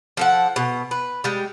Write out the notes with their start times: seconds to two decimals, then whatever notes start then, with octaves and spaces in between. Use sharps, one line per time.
0.17 F3 A4 F#5
0.56 B2
0.91 B4
1.24 G3 G#3